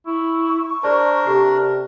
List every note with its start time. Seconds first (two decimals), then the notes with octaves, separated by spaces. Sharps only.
0.07 E4 C#6
0.83 D4 G#4 A#4 C5 D5 A5
1.27 C3 G4 A4 D5